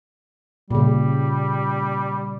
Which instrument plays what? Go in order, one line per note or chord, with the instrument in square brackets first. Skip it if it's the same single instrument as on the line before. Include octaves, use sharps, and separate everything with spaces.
[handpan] A#2 C#3 [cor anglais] G3